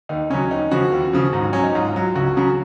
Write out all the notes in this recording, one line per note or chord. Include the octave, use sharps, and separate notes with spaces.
D#2 D#4
C#3 F#3 C#4
D#2 D#4
C#3 F3 F#4
D#2
C#3 F3
G#2
F#3 C#4
D#4
G#2 F4
F#3
C#2 F#4
C#3 F#3